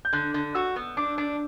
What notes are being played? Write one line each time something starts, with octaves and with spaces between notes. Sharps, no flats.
G6
D3 F#6
D3
F#4 E6
B3
D4 D6
D4